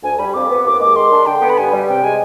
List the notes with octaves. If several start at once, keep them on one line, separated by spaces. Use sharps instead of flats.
D2 G#5
G3 B5
F2 D6
B3
D#2 D6
G#3 D6
D#3 C6
D4
D3 G5
B3
B5
G2 G#5
G3
C3 G5
G#3 G#5